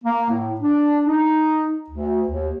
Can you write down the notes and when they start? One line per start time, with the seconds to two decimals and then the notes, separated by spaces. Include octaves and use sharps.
0.04 A#3
0.29 A2
0.60 D4
1.05 D#4
1.89 D2
2.28 D#2